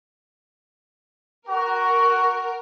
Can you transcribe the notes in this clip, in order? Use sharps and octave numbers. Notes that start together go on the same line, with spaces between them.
F#4 A#4